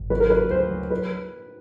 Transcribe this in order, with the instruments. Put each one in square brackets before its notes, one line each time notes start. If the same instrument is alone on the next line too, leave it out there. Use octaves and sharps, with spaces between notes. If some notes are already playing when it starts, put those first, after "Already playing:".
Already playing: [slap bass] G#1
[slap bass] F#3 [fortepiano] B4
[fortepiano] A#4
[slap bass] F#3 [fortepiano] B4
[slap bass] D2 [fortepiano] C5
[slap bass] F#3
[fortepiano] B4